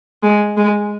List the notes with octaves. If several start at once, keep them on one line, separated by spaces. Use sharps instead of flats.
G#3
G#3